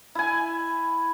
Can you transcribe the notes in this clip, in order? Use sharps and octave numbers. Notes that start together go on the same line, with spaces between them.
E4 G#5